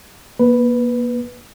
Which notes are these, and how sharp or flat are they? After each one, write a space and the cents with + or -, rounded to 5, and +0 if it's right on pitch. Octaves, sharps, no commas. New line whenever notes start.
A#3 +35 B4 +0